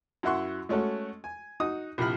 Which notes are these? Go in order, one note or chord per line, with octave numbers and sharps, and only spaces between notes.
F#2 E4 E5 F#5 C6 C#6
G#3 A3 C#4 F#4 A4
G#5
D#4 F#4 D#6
A#1 C3 F3 E4 B5 F6